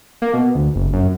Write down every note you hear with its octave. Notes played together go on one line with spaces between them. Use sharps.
A#3
B2
D2
F#1
F#2